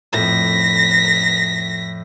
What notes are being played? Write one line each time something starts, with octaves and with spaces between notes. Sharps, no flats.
F2 A2 A#6 B6